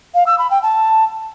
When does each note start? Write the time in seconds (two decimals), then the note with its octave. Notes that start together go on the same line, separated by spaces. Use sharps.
0.15 F5
0.27 E6
0.39 B5
0.51 G5
0.63 A5